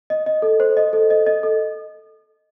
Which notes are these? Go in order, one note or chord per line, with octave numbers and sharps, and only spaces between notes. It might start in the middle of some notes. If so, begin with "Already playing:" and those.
D#5
D#5
A4
C5
D#5
A4
D#5
D#5
A4